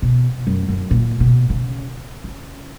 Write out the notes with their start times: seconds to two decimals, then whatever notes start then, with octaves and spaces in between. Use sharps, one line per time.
0.02 B2
0.47 F#2
0.69 F#2
0.91 A#2
1.20 B2
1.50 C#3
2.24 C#3